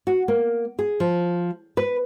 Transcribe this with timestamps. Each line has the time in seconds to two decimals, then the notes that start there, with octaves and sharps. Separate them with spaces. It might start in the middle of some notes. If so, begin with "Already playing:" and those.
0.07 F#4
0.28 A#3
0.79 G#4
1.00 F3
1.77 B4